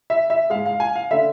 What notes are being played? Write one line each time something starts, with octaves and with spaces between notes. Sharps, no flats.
E5
E5
G#2 G#3 F5
F5
G#5
F5
D3 A3 E5